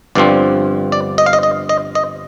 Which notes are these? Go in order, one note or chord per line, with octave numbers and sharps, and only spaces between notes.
G1 G2 F3 C4 D5
D5
D#5
F5
D#5
D#5
D#5
D#5